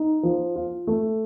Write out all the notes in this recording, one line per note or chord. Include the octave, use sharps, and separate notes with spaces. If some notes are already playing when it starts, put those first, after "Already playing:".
Already playing: D#4
F3
F4
A3